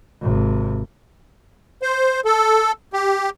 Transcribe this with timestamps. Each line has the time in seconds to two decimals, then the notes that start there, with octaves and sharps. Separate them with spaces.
0.22 G#1 C3
1.82 C5
2.25 A4
2.93 G4